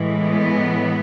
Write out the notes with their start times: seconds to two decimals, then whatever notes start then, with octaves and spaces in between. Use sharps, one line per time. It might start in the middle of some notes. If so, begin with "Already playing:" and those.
Already playing: A2 E3 G#3
0.19 B3